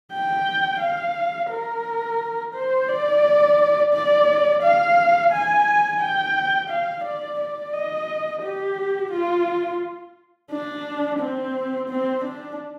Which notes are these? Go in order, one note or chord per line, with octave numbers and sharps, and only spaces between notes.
G5
F5
A#4
C5
D5
D5
F5
G#5
G5
F5
D5
D5
D#5
G4
F4
D4
C4
C4
D4